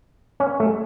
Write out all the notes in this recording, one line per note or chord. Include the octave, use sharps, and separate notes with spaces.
C#4
A3